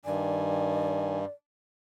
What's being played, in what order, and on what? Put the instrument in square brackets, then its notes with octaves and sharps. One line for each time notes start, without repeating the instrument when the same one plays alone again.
[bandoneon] G2 [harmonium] D#3 G#5 [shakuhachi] D5